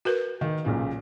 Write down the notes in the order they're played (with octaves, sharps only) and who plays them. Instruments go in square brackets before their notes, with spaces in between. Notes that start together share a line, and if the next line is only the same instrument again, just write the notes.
[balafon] F#4 A#4 B4
[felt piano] D#3
B1 A#2 C#3